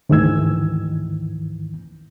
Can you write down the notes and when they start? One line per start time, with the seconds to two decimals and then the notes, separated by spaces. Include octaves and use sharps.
0.09 D2 G#2 D#3 E3 E6 G#6